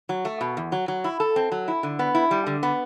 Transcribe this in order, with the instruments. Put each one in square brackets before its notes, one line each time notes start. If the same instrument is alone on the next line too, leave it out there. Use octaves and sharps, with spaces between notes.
[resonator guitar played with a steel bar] F#3
A3
B2
E2
F#3
F#3
E4
A4
C4
F#3
E4
D3
B3
E4
G3
D3
B3